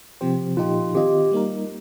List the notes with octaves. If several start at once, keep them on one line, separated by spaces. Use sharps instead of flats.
C3 F3 C4 G4 C5
A#2 F3 D#4 F4 G4
D#3 C4 F4 G4 D#5
G3 A#3 D#4 A#4